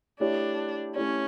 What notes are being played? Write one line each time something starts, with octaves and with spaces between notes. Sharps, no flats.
A3 D4 E4 G4 C#5
A3 C#4 E4 G4 C#5